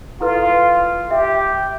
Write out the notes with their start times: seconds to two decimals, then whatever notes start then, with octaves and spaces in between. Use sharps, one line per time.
0.21 E4 F4 A4 B4
1.11 G4 E5